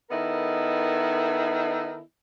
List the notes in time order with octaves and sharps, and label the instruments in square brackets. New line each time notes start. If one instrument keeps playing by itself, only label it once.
[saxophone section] D#3 B3 E4 A4 A#4 D#5